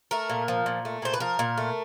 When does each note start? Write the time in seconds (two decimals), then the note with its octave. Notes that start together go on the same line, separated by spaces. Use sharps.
0.11 A3 A#4
0.30 A#2
0.48 F3
0.66 A#2
0.85 A3
1.02 A#2 C5
1.13 B4
1.20 F3 A#4
1.39 A#2
1.57 A3